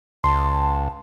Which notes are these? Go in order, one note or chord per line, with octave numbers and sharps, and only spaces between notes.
C#2 A5 C6